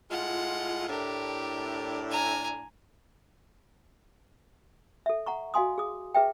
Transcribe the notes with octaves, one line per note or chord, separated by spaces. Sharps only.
A2 G#3 F4 F#5
A2 D4 G4 A#4
G#5 A#5
A4 E5
F#5 A#5 C#6
F#4 D#5 F5 G#5 C6 D#6
G#4 D#6
G#4 B4 E5 G5